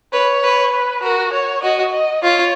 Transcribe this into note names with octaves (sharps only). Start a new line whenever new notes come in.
B4 C#5
B4
B4
F#4 A#4
C#5
F#4 D#5
D#5
F4 C#5